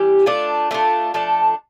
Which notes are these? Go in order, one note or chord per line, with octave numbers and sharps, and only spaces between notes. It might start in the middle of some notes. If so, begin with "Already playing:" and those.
Already playing: E3 G3 G4
A3 D4 F4
A3 D4 F4
F3 A3 D4 A4